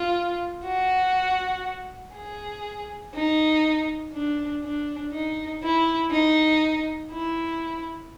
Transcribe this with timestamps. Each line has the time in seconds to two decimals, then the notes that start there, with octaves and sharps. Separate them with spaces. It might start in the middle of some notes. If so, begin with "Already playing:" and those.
Already playing: F4
0.65 F#4
2.14 G#4
3.14 D#4
4.13 D4
4.63 D4
5.13 D#4
5.63 E4
6.12 D#4
7.12 E4